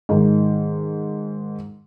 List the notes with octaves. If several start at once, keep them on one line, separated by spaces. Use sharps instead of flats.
G#2 D#3